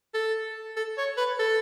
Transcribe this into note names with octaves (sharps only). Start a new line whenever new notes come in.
A4
A4
C#5
B4
A4